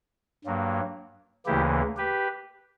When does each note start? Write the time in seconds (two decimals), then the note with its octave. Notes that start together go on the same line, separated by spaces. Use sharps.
0.45 G2 F#3 A#3
1.46 D2 C#3 E3 A#3 E4 G4
1.97 G4 B4